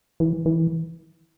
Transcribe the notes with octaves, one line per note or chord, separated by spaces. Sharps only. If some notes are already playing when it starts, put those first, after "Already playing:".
E3
E3